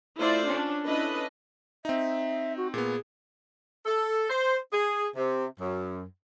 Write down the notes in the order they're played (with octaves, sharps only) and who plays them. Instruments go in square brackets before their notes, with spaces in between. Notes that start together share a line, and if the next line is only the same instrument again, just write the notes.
[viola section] A3 E4 F4 C5 D5
C#4 D4
C#4 D4 E4 A4 B4 D#5
[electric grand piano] C4 D#4 [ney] E5
[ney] F#4
[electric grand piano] A#2 B3 [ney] G#4
[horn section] A4
C5
G#4
C3
F#2